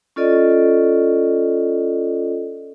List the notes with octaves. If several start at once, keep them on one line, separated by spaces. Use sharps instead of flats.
C#4 F4 A4 D5 D#5